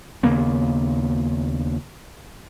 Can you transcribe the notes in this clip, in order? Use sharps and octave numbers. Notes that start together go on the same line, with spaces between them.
D#2 C#3 A#3 B3